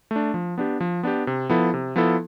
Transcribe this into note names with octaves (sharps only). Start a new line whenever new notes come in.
A3
D4
F3
B3 D4 G4
F3
B3 D4 G4
C3
F3 B3 E4 A4
C3
F3 B3 E4 A4